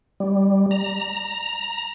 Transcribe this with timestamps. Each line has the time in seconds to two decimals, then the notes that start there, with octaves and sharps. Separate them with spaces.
0.20 G3
0.71 A#5